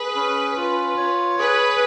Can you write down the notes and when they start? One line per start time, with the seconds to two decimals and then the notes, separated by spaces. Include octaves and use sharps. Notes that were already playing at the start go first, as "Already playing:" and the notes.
Already playing: G#4 B4
0.16 C#4
0.57 F4
0.97 C#5
1.39 G#4 B4